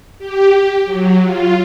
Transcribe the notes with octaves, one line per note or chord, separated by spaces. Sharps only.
G4
F#3
F4